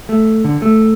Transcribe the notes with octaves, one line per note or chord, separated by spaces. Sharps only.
A3
D3
A3